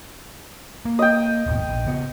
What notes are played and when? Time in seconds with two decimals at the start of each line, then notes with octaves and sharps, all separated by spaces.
0.85 A#3
0.99 D#5 G5
1.46 D#1 G#1 B2
1.68 A#1
1.87 C#3 B3